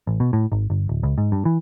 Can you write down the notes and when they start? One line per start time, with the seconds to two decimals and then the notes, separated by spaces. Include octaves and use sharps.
0.07 A1
0.20 B2
0.33 A2
0.52 G#1
0.70 G1
0.89 D1
1.03 C#2
1.18 G#2
1.32 G2
1.45 E3